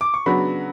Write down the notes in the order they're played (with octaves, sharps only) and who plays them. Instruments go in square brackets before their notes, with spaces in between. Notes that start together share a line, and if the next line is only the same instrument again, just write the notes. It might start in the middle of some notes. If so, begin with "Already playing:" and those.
[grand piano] D6
C#6
[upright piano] C#3 F#3 B3 D4 F#4 [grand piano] B5